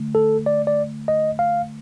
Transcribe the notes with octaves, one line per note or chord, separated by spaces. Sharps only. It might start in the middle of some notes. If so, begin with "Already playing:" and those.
Already playing: D3 A3
A4
D5
D5
D#5
F5